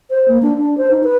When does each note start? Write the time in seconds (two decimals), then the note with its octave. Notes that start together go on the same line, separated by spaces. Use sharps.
0.10 C5
0.28 A#3
0.42 D4
0.58 D4
0.78 C5
0.91 D#4
1.03 B4